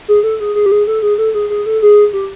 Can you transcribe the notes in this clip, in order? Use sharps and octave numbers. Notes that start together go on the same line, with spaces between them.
G#4
A4
G#4
G#4
G4
G#4
A4
G#4
A4
G#4
G#4
A4
G#4
G4